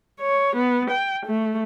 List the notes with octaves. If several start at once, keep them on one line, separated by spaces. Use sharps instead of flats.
C#5
B3
G5
A3